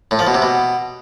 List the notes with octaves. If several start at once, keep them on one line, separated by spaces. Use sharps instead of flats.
A2
F3
B2
C3
B2